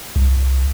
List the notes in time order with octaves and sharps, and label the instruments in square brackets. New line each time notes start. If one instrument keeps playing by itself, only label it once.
[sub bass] C2